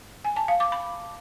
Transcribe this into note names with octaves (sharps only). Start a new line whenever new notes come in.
G#5
A5
F5
D6
B5